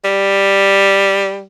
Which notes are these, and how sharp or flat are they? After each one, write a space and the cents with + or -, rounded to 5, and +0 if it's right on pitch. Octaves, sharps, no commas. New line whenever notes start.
G3 +5